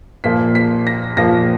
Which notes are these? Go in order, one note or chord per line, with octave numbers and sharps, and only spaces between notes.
A#2 F3 A#3 B6
B6
A#6
A#2 F3 A#3 A#6